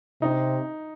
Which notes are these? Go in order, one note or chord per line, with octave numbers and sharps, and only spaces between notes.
C3 D#4